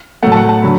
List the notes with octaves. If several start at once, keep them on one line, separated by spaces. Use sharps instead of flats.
A2 F#3 A3 F#5
A5
F#5
A5
D3 F#3 B5